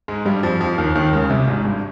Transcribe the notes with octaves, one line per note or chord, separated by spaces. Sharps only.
G#2 G#3
G2 G3
F2 F3
F2 F3
D#2 D#3
D#2 D#3
C#2 C#3
C2 C3
G#1 G#2
G2